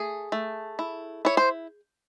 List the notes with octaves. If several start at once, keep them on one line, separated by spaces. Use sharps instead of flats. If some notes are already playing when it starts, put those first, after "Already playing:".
Already playing: A3 G#4
A3
E4
E4 C#5
C5